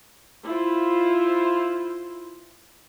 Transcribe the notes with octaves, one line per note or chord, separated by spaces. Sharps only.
E4 F4 C5